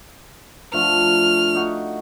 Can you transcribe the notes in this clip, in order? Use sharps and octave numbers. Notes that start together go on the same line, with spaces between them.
D3 F3 A3 F6
D#4 F#4 F5